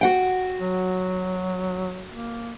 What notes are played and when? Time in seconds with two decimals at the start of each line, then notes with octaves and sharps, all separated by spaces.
0.01 F#4 F#5 G5
0.60 F#3
2.11 A#3